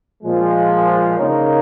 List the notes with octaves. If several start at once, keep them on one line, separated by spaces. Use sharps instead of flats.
A#2 F3 G#3
C#3 A#3 D#4 A#4 C#5